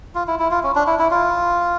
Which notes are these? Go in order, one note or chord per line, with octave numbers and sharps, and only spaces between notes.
F4
E4
E4
F4
C#4
D4
E4
E4
F4